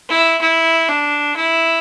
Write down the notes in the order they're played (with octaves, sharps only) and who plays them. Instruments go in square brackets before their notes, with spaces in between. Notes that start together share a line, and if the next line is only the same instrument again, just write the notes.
[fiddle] E4
E4
D4
E4